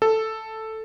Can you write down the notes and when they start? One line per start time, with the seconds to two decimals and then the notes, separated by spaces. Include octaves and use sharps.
0.02 A4